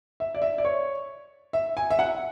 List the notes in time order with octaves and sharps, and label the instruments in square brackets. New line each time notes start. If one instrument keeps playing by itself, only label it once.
[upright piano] E5
D5
E5
D5
C#5
E5
G#5
E5
F#5